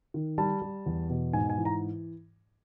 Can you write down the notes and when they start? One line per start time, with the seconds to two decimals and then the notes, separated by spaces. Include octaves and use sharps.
0.14 D#3
0.38 G3 A5
0.62 G3
0.86 E2
1.10 B2
1.33 G#2 G#5
1.50 G#5
1.57 E3
1.65 A#5